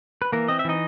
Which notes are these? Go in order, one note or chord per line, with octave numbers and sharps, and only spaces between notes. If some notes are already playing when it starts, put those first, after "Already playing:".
B4
E3 A#3 A#4
C4 D#5
E5
E3 D#4 D#5